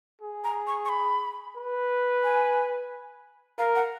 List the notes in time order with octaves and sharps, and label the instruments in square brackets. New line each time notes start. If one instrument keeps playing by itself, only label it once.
[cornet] G#4
[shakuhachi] A#5
C#6
C#6
B5
[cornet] B4
[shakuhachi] G#5
[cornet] A#4 [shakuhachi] F5
[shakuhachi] F#5